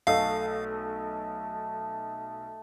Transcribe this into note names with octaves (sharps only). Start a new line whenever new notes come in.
B1 A3 D#5 F5